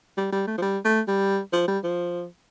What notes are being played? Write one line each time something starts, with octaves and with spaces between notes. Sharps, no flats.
G3
G3
A3
F3
G3
A3
G3
F3
G3
F3